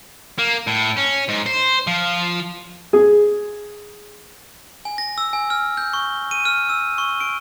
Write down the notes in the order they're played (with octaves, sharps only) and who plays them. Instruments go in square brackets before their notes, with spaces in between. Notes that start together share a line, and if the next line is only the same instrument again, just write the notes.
[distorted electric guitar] A#3
A2
C#4
G#2
C5
F3
[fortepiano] G#4
[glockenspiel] G#5
A#6
E6
G#5
F6
G6
C#6
D#7
F6
E6
C#6
D7